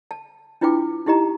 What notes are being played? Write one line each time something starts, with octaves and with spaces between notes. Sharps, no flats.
A5
D4 E4 F4 B4 G5 D6
D#4 E4 G4 D#5 A#5